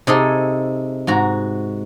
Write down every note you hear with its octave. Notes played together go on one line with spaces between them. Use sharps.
C3 D#4 G#4 A4
G#2 F#4 A#5